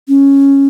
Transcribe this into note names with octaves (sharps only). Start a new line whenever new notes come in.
C#4